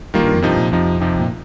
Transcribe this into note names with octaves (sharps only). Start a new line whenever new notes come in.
D#3 G3 A#3 F4
G2
F2
G2 C3 F3 D#4
A#2
F2 C3 F3 D#4
C3 F3 D#4 G4
A#2